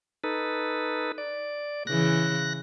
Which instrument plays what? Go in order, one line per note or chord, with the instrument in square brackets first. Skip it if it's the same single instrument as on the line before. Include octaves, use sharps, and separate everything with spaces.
[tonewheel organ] D#4 A4 B4
D5
[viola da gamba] C#3 E3 [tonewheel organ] F#6 A#6